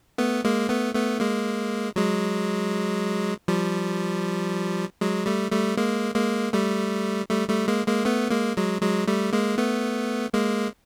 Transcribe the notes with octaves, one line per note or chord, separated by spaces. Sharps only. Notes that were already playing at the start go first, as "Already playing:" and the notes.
A3 B3
G#3 A#3
A3 B3
A3 B3
G#3 A#3
F#3 G#3
F3 G3
F#3 G#3
G3 A3
G3 A3
G#3 A#3
G#3 A#3
G3 A3
G3 A3
G3 A3
G#3 A#3
G#3 A#3
A3 B3
G#3 A#3
F#3 G#3
F#3 G#3
G3 A3
G#3 A#3
A3 B3
G#3 A#3